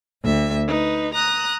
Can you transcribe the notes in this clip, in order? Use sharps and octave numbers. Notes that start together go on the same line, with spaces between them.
D2 E5
D#4 B4
A#5 D#6 F#6